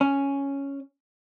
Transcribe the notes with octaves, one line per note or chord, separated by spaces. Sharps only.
C#4